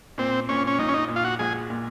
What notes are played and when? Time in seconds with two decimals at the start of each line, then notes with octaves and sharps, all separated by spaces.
0.18 A#2 C4
0.49 A#2 C#4
0.67 C#4
0.79 A#1 D#4
0.89 C#4
0.94 D#4
1.08 A#2
1.16 F4
1.24 F#4
1.39 A#1 G#4
1.70 A#2